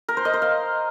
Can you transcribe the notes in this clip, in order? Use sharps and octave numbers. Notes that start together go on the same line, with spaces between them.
A#4
C5
D#5
C5
F5